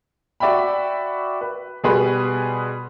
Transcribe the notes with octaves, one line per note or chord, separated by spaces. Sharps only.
F#4 D5 E5 G5 B5
B4
B2 G3 G#4 B4 C6